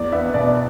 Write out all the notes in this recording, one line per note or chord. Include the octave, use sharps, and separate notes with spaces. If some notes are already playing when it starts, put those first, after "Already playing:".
Already playing: E2 D5
B3 E5
B2 D5